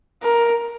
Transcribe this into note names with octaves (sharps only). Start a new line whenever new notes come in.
A#4